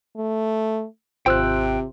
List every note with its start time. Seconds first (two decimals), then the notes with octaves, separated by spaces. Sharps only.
0.17 A3
1.26 G#1 C3 F4 C5 G5 E6 F#6